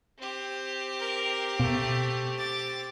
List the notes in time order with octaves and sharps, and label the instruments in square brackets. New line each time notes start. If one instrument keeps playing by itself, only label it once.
[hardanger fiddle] C4 G4
[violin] A#4
[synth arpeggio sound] B2 [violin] A3
[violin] D6 A6